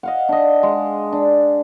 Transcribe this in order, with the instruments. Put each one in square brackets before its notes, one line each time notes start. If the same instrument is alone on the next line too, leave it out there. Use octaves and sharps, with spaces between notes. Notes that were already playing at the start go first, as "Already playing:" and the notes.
[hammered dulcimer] D#5 F5 F#5
D4 D#5
G#3
D4